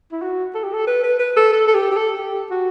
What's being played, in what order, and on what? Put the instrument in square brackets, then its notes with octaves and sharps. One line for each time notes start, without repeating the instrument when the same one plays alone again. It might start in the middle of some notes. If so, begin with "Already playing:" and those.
[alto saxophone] E4
F#4
A4
G4
A4
B4
B4
B4
A4
A4
A4
G4
G4
A4
G4
F#4